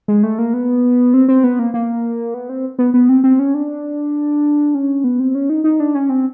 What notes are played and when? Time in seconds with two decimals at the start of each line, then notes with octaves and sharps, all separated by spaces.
0.08 G#3
0.23 A3
0.39 A#3
0.54 B3
1.14 C4
1.28 C4
1.44 B3
1.59 A#3
1.74 A#3
2.34 B3
2.49 C4
2.79 B3
2.94 B3
3.09 C4
3.24 C4
3.39 C#4
3.54 D4
4.75 C#4
5.04 B3
5.20 C4
5.35 C#4
5.50 D#4
5.64 D#4
5.80 D4
5.95 C#4
6.09 C4